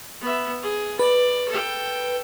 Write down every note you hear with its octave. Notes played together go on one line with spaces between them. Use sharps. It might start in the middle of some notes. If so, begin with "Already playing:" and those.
B3 E5
G#4
B4 D5
A4 G5